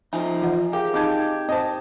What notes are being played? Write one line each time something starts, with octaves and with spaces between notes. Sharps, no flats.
F3 D#4 E5 G#5
E3 F4 F#5
G4 G#4 A#4 F5
C4 D#4 D#5 A5 D6 G6 G#6
C4 C5 D#5 A5